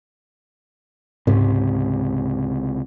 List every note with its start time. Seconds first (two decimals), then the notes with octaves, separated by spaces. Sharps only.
1.27 C#2 G#2 C3